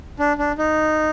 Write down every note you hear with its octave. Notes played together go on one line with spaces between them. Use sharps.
D4
D4
D#4